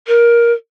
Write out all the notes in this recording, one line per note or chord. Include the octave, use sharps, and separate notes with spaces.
A#4